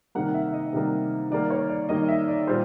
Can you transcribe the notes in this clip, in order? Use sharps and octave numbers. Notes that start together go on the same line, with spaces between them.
C3 D#3 G3 A#3 F#5
E5
E5
D#5
C3 D#3 G3 A#3
D#3 G3 A#3 D5
C#5
D5
D#3 G3 A#3 D#5
E5
D5
A#2 G3 C5